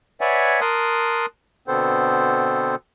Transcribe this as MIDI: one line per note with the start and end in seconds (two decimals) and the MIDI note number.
0.21 0.60 71
0.21 0.60 73
0.21 0.60 74
0.21 0.60 76
0.21 0.60 78
0.21 0.60 80
0.61 1.26 70
0.61 1.26 81
0.61 1.26 84
0.61 1.26 87
0.61 1.26 90
1.68 2.75 47
1.68 2.75 50
1.68 2.75 59
1.68 2.75 60
1.68 2.75 69
1.68 2.75 72